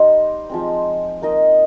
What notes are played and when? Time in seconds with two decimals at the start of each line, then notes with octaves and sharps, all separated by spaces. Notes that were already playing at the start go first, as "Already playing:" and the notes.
Already playing: G3 D#4 G4 C5 D#5
0.50 F3 G#3 C4
1.22 A#3 D#4 A#4 D#5